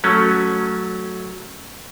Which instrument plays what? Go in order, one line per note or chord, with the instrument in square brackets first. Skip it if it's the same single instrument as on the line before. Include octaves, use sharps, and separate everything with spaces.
[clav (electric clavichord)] F#3 A3 C#4